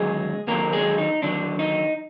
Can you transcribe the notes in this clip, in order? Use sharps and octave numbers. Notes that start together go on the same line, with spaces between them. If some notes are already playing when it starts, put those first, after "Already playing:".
Already playing: D#2 D3 F#3 G#3 G#4
D#2 D3 F#3 A#3 A#4
G#3 G#4
D#4
D#2 D3 F#3 D4
D#4